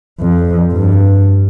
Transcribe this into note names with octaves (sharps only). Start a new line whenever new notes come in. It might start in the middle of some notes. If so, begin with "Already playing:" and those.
F2
G2